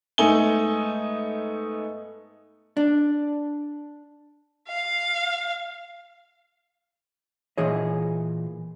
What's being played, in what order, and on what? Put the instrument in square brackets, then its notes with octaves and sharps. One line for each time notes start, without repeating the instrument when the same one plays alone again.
[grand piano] G#2 A3 B3 D#4 G#5 G7
[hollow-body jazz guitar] D4
[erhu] F5
[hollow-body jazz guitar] A#2 E3 G#4 C#5 D#5